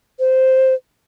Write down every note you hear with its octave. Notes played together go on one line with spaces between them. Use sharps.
C5